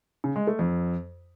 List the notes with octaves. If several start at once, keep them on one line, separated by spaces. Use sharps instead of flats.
C#3
G#3
A3
F2